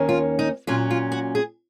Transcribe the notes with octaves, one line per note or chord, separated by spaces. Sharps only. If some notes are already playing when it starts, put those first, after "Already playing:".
Already playing: D#2 D#3 A#3 C#4
F4
D#4
A#2 F#3 C#4 F4
F4
F#4
G#4